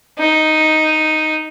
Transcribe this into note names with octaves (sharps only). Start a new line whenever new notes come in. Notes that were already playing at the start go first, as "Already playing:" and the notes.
D#4